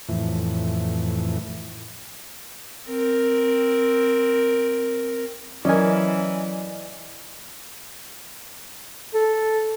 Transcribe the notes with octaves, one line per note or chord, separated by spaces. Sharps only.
F2 A2 E3
C4 A#4
E3 F#3 C#4 A#4 D5 D#5 G#5
A4